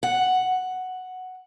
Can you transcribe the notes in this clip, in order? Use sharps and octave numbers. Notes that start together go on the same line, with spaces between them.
F#5